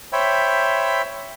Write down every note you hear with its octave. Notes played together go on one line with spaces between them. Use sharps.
C5 C#5 E5 G5 B5